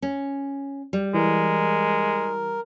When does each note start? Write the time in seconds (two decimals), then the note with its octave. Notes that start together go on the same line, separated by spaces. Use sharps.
0.02 C#4
0.93 G3
1.14 E3 G#3 A#4